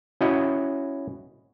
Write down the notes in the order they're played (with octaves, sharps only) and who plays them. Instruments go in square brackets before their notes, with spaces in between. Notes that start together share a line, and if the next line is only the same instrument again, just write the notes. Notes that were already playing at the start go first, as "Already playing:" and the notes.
[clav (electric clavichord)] C#4 E4 F#4 D#5